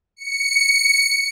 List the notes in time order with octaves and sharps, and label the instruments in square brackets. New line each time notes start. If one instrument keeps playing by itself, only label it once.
[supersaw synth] C#7